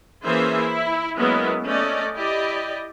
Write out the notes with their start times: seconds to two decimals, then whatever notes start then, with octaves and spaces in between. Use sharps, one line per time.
0.25 E3 A#3 C#4 G#4 C5 E5
0.61 E4
1.17 F#3 G#3 A#3 B3 C#4 E4
1.66 A3 C#4 D5 D#5
2.15 E4 G4 D5 D#5